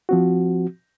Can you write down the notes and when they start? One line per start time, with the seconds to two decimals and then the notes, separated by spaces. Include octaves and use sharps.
0.09 F3 C4 F#4